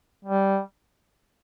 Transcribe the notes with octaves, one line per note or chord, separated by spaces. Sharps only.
G3